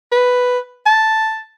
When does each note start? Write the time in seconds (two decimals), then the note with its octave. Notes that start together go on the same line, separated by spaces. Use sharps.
0.12 B4
0.86 A5